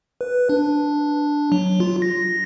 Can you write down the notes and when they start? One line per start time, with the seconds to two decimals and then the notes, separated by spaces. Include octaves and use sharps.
0.21 B4
0.49 D4
1.52 F#3
1.80 F4
2.02 A#6